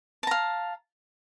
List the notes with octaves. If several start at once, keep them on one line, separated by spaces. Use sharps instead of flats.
F5 A5 A#5